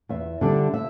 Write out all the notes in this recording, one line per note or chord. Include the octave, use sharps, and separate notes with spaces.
E2 E5
D3 G3 D4
E5